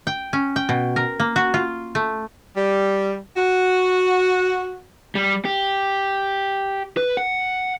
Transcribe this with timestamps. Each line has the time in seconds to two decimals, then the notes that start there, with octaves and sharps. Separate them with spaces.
0.07 G5
0.33 C#4
0.56 G5
0.69 B2
0.96 A#4
1.20 A#3
1.36 F#4
1.54 F4
1.95 A3
2.57 G3
3.37 F#4
5.15 G3
5.45 G4
6.97 B4
7.17 F#5